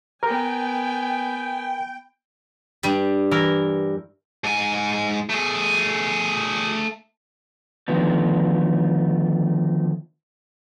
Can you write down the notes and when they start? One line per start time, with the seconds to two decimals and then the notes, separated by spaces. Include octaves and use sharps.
0.23 B3 A#4 G5 G#5
2.83 G2 G3
3.31 E3 A#4
4.44 G#2 G#5
5.29 A3 G#4
7.88 D3 D#3 F3 A3 B3